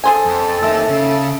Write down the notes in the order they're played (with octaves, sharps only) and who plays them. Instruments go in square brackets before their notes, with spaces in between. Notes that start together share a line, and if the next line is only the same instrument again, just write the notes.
[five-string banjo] G#4 C5 G#5 [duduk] A4
[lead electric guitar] F2
[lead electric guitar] A#3 D#4 [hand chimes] E5 E6
[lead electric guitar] C#3